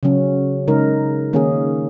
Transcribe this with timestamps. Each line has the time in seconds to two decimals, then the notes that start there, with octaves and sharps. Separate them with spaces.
0.03 C#3 F#3 C#4
0.68 C#3 G#3 D#4 A#4
1.33 D#3 A#3 C#4 G#4